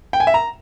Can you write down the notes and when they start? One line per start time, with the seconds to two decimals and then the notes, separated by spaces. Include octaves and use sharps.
0.13 G5
0.20 G#5
0.27 E5
0.34 A#5